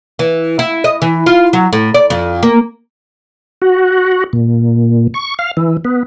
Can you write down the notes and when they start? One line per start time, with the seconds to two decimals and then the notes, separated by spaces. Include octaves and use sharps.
0.19 E3
0.59 E4
0.84 D#5
1.02 E3
1.26 F4
1.53 F#3
1.73 A2
1.94 D5
2.10 F2
2.43 A#3
3.62 F#4
4.33 A#2
5.14 C#6
5.39 F5
5.57 E3
5.85 B3